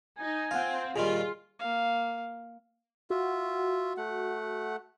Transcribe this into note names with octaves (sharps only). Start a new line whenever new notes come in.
D#4 G#5
C4 F4 F5 F#5
A#2 D#3 G3 F4 G#4
A#3 F5
F4 F#4 E5
A3 F#5